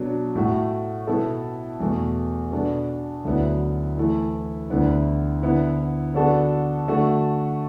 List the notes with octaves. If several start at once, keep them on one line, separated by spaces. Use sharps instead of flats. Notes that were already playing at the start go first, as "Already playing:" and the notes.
Already playing: B2 F#3 D4
A2 A3 F#4
B2 B3 E4 A4
E2 B2 A3
B2 B3 D4 A4
D2 D3 F#3 B3 E4
E3 A3 E4
D2 D3 B3 E4
D3 B3 E4
D3 B3 D4 F#4 A4
D3 A3 F#4 A4